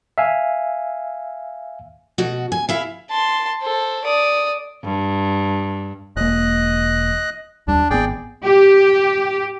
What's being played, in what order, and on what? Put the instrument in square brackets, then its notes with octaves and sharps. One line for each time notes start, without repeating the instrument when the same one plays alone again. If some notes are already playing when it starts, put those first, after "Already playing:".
[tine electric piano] E5 F5 G#5
[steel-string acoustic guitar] B2 F#4
G#5
E4 E5 F5
[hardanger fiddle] A5 C6
A4 C5
D5 D#6
[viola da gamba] G2
[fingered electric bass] E1 A#3 [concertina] D#5 F#6
[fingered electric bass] D#2 G3 [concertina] D4
[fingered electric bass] G#1 B3 [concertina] G#4 D5 G5
[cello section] G4